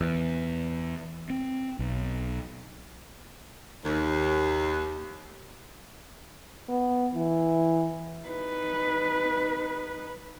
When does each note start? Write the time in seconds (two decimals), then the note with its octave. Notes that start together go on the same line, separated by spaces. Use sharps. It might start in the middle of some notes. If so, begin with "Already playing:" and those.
0.01 E2
1.30 C4
1.79 B1
3.84 D#2
6.68 B3
7.15 E3
8.29 D#4 B4